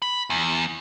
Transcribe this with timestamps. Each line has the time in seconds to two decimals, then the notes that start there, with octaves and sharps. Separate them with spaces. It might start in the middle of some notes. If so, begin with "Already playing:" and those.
0.02 B5
0.30 E2